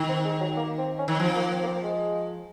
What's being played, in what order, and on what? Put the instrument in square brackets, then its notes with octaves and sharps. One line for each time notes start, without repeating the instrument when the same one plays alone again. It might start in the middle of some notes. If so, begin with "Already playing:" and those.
Already playing: [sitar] D#3
[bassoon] C4
G#3
F#3
A#3
C4
C#4
[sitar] D#3
[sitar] F3 [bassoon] C4
[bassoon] A#3
C4
A#3
C4
G#3